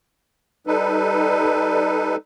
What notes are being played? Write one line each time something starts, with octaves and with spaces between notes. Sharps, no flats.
G3 D#4 A4 B4